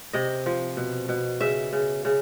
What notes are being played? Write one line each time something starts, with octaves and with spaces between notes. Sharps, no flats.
C3 D#5
F3
B2
B2
C#3 E5
C#3
C#3